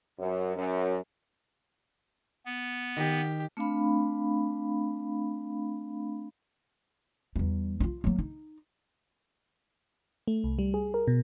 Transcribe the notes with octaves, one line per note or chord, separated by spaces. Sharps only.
F#2
F#2
B3
D#3 G4 D#5
A3 C4 D4 F5 B5
E2 G3
D#4 F4
F#3 A#3
D#4
A3
C2
G3
G#4
A#4
B2